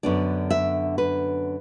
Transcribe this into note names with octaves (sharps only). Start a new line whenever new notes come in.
F#2 D3 B3 D4 D5
E5
B4